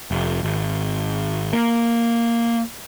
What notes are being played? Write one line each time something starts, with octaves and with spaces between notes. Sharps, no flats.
F1
G#1
A#3